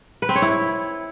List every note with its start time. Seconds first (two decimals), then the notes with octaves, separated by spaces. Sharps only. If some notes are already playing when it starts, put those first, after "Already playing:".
0.22 B4
0.29 C4
0.35 C#5
0.42 E4